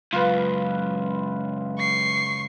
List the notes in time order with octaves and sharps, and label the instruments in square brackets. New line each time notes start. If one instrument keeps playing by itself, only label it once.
[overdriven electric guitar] C#2 F#2 [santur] F4 B4
[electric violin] C#6 C7